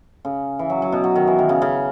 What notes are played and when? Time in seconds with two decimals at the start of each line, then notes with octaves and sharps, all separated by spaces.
0.25 C#3
0.59 E3
0.70 F#3
0.82 F#3
0.92 B2
1.04 F#3
1.16 D#3
1.27 E3
1.39 D#3
1.49 C#3
1.62 C#3